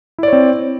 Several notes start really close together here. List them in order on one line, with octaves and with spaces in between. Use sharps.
E4 D5 C#5 C4